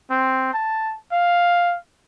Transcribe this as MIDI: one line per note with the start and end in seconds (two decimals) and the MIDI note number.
0.10 0.54 60
0.54 0.94 81
1.12 1.76 77